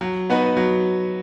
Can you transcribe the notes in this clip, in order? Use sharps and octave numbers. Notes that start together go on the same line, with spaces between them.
F#3
B3 D#4 F#4 B4
F#3